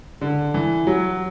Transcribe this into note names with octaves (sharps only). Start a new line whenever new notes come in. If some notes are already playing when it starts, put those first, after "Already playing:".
D3
E3
F#3